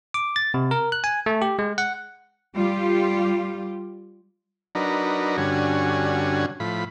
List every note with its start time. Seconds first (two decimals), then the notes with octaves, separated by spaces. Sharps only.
0.14 D6
0.36 A6
0.54 C3
0.71 A#4
0.92 F#6
1.04 G#5
1.26 A3
1.42 G4
1.59 G#3
1.78 F#5
2.54 G3 F4 G4
4.75 F#3 D4 D#4 A#4 B4
5.38 G2 D3 C#4 F#4 G#5
6.60 A2 F3 B5